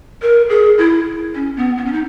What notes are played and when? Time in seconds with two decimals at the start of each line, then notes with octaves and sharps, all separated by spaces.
0.22 A#4
0.49 G#4
0.78 E4
1.35 C#4
1.57 B3
1.78 B3
1.86 C#4
1.93 D#4